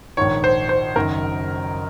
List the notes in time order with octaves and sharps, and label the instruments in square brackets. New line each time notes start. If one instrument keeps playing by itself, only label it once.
[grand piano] A#1 G#2 D#3 C#5
C5
C5
F#1 F#2 D#3 A#4